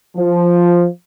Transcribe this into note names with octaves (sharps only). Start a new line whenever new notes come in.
F3